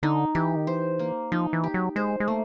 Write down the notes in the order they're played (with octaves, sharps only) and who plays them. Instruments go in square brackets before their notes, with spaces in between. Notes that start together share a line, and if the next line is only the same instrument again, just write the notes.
[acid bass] D3 [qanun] D#4
[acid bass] E3 [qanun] G4
[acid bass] D#3
[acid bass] E3 [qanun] C5
[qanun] A#3
[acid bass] F3 [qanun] D#4
[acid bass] E3
[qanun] G4
[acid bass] F#3
[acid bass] G#3 [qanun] C5
[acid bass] G#3
[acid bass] A3 [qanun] A#3